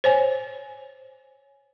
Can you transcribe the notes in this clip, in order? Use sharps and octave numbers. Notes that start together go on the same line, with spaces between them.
C5 C#5 G#5